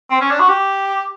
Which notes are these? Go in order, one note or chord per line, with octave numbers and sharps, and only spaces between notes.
C4
C#4
D4
F#4
G4